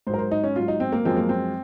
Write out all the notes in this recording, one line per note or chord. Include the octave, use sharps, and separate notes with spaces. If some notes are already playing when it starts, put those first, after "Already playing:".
G#2 F#3 A#4 C5
C5
D#4
C#4
G#2 F#3 F4
D#4
C4
A#3
F#2 F3 G#3 C4
A#3
C4